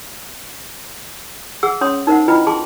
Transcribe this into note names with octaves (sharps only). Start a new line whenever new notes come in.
G#4 F#5 E6
C#4 C#5 C6 D#6
D#4 A#4 C5 E5 F#5
E4 F4 B4 D#5 G5 B5
G#4 A5 C6 D6